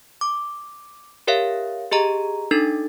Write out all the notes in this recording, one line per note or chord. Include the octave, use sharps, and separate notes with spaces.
D6
G4 A#4 C#5 E5 F5
G4 G#4 D#5 A#5
D4 D#4 A4 A6